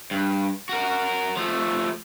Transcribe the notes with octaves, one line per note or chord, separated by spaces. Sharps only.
G2
F#4 A#4
F3 A3